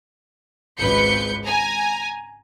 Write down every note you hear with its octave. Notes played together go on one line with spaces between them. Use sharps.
G#1 C#2 B4 G6 C#7
G#5 A#5